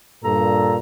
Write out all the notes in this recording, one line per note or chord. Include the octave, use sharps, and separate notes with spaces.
G2 A#2 A4 A#5